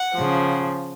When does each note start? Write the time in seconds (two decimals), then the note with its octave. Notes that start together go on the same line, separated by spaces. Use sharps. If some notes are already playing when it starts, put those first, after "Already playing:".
Already playing: F#5
0.16 C#3 F3